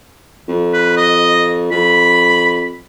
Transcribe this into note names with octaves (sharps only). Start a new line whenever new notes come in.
F2
B4
D#5
F2 B5